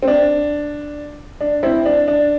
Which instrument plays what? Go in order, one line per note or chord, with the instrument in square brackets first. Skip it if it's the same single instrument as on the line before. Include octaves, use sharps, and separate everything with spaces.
[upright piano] C4
D4
D4
C4 E4
D4
D4